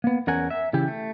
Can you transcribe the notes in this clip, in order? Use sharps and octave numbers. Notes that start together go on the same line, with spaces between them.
A#3 B3
E2 C#4 A#4 F#5 G#5
E5
C#3 E3 E4 G4
A3